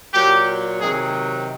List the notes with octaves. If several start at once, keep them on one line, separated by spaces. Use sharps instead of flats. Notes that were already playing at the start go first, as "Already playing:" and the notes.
A#2 F#3 G4
C3 D#3 F#3 G#4